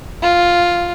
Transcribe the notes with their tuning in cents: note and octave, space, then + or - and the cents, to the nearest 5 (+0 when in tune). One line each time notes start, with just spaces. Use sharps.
F4 +0